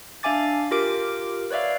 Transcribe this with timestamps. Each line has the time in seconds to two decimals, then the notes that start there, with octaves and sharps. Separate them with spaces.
0.23 D4 E5 F5 G#5 D6 A6
0.71 F4 G4 A#4 D6 D7
1.50 B4 C#5 D5 E5 F5